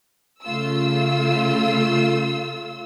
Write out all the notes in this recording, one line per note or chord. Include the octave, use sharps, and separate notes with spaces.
C#3 A3 F4 E6